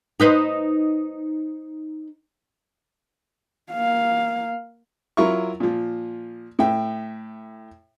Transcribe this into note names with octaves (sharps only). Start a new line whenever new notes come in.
D#4 B4 C5
A#3 F5
F#3 E4 F4 A#4 E5 C#6
A#2 F3
A2 E5 G5